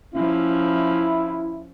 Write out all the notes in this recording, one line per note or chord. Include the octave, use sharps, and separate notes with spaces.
F3 C#4 E4